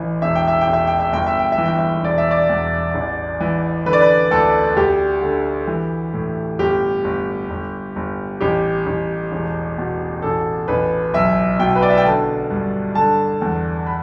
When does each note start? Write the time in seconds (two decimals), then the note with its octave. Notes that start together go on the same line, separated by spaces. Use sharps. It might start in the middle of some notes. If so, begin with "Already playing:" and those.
Already playing: A1 E3
0.22 E1 E5
0.35 G5
0.48 E5
0.61 G5
0.67 E1
0.73 E5
0.87 G5
1.00 E5
1.12 G1 G5
1.27 E5
1.39 G5
1.52 E5
1.58 E3
1.65 G5
1.78 E5
2.03 E1 D5
2.18 E5
2.31 D5
2.49 E2
2.95 A1
3.40 E3
3.85 D3 B4
3.93 D5
4.01 B4
4.31 D2 A4
4.76 D2 G4
5.22 D3
5.67 E3
6.13 A2
6.59 G1 G4
7.04 G1
7.50 G1
7.96 G1
8.41 A1 G4
8.86 A1
9.32 E1
9.78 B2
10.22 A1 A4
10.68 A1 B4
11.14 B1 E5
11.59 B2 G5
11.76 B4
11.82 D5
11.90 E5
11.98 G5
12.05 D3 A5
12.51 G2
12.95 D3 A5
13.41 E2
13.87 B5